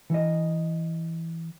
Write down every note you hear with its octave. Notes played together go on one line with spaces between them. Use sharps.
E3 D#5